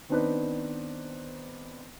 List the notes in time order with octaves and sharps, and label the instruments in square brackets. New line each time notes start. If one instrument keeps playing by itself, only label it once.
[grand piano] D#3 B3 C4 D4 D#4 B4